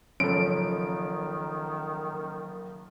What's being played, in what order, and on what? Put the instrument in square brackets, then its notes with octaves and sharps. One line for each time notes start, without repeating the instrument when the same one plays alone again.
[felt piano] F#1 F3 [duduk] D#3 [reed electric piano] C#4 A4 [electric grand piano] D7